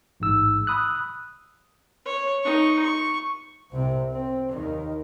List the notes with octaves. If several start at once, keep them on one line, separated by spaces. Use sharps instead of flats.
A1 G#2 E6
B5 D#6 E6 F#6
C#5
D#4 C#6
C#6
C2 C3
C4
D#2 D#3